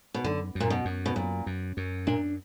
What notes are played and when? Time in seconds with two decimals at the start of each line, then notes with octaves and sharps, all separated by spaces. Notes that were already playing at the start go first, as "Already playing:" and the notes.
0.14 B2
0.24 F#2 D3
0.55 F#2
0.60 A#2
0.70 B2
0.85 F#2
1.06 B2
1.16 F#2 A#2
1.46 F#2
1.77 F#2
2.07 A#2 D4